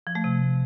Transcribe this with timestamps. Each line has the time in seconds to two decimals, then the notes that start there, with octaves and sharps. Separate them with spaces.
0.07 F3
0.15 A3
0.24 C3